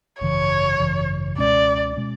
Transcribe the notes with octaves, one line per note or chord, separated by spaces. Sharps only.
G#1 F#2 C#3 E3 C#5
G#1 F#2 C#3 E3
C#2 B2 G#3 C#4 D5
B2 G#3 C#4